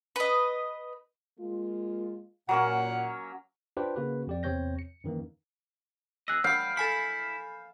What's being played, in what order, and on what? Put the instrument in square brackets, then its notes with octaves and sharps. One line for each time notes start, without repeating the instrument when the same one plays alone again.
[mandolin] B4 D#5
[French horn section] G#3 A#3 F4
[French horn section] A#2 [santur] F#3 A#3 C#4 [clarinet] F#5
[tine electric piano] D4 F4 G4 B4 C5
C#3 A#3 F#4 B4
F2 G4 D5
E2 C3 C4 C#5 G6 A#6
C#7
F#2 D#3 E3 A#3
[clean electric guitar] E2 G#4 D#5 [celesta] E6 F#6
[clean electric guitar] G3 [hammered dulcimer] F5 [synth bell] F#5 B5 [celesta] G6
[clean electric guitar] E4 [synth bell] A4 G#5 B5